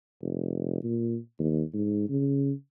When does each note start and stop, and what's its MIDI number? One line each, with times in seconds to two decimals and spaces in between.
0.22 0.81 29
0.83 1.17 46
1.39 1.62 39
1.73 2.06 44
2.09 2.52 49